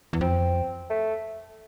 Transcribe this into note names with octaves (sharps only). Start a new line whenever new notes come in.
E2
F2 C4
A3